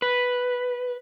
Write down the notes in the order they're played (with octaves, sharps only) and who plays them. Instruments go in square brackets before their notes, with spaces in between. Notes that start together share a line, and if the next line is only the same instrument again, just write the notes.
[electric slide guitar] B4